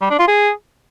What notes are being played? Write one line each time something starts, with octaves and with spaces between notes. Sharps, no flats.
G3
D4
F4
G#4